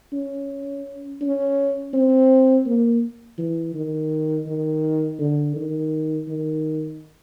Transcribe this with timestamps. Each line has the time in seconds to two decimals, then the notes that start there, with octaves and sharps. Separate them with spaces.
0.13 C#4
1.21 C#4
1.93 C4
2.66 A#3
3.38 E3
3.74 D#3
4.46 D#3
5.19 D3
5.56 D#3
6.28 D#3